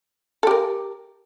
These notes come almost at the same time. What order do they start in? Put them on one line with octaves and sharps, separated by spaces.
A4 G4 A#4